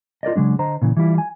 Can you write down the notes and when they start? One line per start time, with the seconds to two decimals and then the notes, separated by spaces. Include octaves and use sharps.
0.23 F4 A#4 D5 D#5
0.36 C#3 F#3 G#3 D4
0.59 D3 C5 D#5 A#5
0.82 A#2 C#3 E3
0.97 E3 G3 E4 F4
1.18 G#5